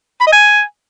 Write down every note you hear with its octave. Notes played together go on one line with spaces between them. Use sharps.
B5
D#5
G#5